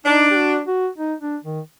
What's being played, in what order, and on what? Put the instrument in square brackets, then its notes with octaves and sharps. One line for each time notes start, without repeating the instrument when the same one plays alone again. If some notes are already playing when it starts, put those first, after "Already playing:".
[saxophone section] D4 [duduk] D#4
[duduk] G4
F#4
F#4
D#4
D4
D#3